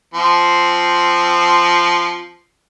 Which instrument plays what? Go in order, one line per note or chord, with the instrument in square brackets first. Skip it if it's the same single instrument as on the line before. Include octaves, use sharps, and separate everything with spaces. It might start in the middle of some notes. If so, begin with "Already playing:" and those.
[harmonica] F3 C4